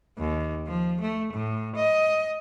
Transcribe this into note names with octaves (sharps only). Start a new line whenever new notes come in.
D#2
F3
A3
A2
D#5